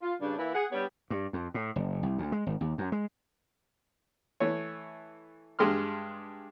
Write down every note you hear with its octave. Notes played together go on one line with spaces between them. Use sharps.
F4
G2 C#3 D4
E3 A#3 E4
G#4 F#5
G3 B3 D4 G4 C#5
G2
F2
A2
F#1
C2
D2
G#3
G#1
D#2
F#2
G#3
E3 A3 C#5
G2 G#3 G4 C6 F6